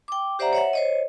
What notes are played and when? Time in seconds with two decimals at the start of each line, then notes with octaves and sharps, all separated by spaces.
0.08 G5 D6
0.39 G4 C5 D5 E5 F#5 A#5
0.53 C#5 E5 F#5
0.73 C5 C#5 D#5